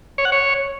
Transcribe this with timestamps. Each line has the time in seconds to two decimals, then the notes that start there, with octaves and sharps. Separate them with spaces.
0.18 C#5
0.25 F#5
0.32 C#5